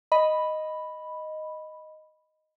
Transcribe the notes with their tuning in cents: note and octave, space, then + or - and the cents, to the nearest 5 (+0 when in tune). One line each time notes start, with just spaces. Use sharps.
D#5 +0 B5 +0